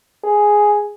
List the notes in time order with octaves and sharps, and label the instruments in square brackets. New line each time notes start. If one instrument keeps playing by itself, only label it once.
[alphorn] G#4